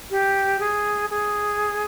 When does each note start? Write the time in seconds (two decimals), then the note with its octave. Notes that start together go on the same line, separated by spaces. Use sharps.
0.11 G4
0.60 G#4
1.10 G#4